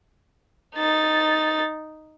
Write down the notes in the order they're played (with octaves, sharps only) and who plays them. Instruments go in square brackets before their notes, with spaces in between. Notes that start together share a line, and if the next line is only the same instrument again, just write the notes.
[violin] D#4 A6